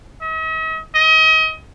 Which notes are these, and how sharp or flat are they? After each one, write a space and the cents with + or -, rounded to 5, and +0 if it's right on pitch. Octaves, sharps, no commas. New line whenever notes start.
D#5 +45
D#5 +35